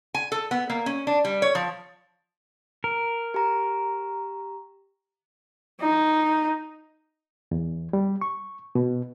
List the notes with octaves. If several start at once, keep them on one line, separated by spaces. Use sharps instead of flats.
G#5
A4
B3
A#3
C#4
D4
G3
C#5
F3
A#4
G4 A#5
D#4
E2
G3
C#6
B2